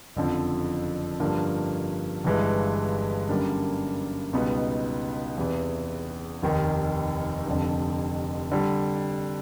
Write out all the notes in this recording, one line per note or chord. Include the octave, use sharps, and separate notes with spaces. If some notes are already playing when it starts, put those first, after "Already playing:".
F#1 F2 D3 F3
G2 D3 F3 A#3
G1 G2 E3 G#3
F#2 D3 G3 A#3 D4
C#2 B2 G3 B3 D#4
E2 C3 E3
F1 D#2 D#3
F1 F2 D3
D3 G3